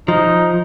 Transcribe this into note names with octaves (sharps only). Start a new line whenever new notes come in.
F3 D#4